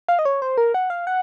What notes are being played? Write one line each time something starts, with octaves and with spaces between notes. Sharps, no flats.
F5
D#5
C#5
C5
A#4
F#5
F5
F#5